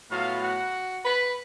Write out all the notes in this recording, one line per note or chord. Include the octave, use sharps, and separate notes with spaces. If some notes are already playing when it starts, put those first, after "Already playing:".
A2 F#3 B3 F4 F5
F#4 F#5
B4 B5